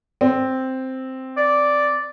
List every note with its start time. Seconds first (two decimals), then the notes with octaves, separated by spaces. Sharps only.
0.21 C4
1.37 D5